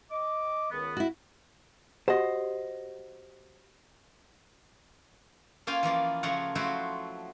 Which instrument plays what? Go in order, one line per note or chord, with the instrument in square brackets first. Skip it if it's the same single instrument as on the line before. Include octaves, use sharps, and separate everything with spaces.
[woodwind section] D#5 D6
C#2 D#3 B3
[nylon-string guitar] E4 F#4
[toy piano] F#4 G4 F#5 [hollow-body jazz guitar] C5 D#5
[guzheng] A#3 C#4 F4 F5 G5 G#5
E3 F3 A#3 D5
C#3 F3 A3 A#4 C#5 F#5
F3 F#3 A3 E4 F#4 C5